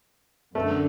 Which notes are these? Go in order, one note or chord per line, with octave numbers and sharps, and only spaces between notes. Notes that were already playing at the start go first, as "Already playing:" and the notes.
F#2 D3 A3